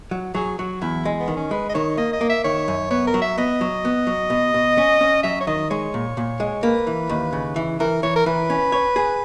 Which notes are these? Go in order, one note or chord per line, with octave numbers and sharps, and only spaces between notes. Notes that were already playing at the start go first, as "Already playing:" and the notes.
F#3
F#3 G#4
F#3 F#4
E2 E4
G#3
B3
D#3
C#4
G#3 B4
D#5
D#3 C#5
A#3 D#5
D#5
A#3
E5
D#3 C#5
F#2
B3 C#5
A#4
F#3
E5
B3 D#5
F#3
B3
F#3
B2
B2
C#4
C#4
F#3 E5
C#5
D#3 D#5
G#3 C#5
A#2
A#2
G#3
A#3 B4
E3
D#2
C#3
E3
E3 A#4
E3 C#5
A#4
E3 B4
C#4
C#5
G#4